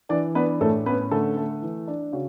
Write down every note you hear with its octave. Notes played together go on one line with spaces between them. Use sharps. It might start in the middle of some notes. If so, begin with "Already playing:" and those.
E3 D4 D5
B3 D4 B4
A2 A3 A4
B3 C#4 B4
D3 A3 A4
A3
E3
D4
C#3 F#4